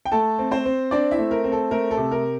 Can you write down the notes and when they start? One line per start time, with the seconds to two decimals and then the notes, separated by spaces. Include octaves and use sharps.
0.05 G5
0.12 A3 A4 A5
0.39 C4
0.51 C4 C5
0.66 C4
0.91 C4 D4 D5
1.11 E4 E5
1.18 A3
1.31 A#4
1.44 C4
1.52 A4
1.71 A3 A#4
1.91 A4
1.97 C3
2.11 A#4